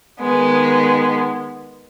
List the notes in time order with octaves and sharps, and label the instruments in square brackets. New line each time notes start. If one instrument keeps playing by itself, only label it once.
[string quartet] D#3 G#3 B3